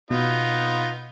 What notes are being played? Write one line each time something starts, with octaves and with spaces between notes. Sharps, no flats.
B2 B3 D#4 F4